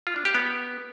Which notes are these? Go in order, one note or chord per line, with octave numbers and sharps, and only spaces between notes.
F4
D4
G4
B3